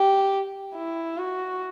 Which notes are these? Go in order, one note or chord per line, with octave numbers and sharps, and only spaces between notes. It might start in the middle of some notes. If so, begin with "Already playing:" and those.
Already playing: G4
E4
F#4